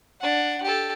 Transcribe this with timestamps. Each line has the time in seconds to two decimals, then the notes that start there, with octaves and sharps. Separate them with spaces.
0.21 D4 F#5
0.63 G4 A4